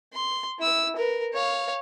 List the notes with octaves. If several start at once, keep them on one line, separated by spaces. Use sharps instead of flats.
C6
E4 E6
A#4 B4
C#5 F5